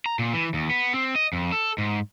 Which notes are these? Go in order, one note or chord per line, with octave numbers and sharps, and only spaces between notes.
A#5
A#2
E3
D#2
B3
C4
D#5
F2
A4
G#2